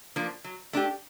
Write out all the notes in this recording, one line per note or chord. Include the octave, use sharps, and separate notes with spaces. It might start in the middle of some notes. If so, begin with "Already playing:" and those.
F3 A#3 D4
F#3
A3 D4 G4